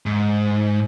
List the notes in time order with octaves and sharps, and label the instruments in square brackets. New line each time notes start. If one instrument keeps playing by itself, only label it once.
[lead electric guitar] G#2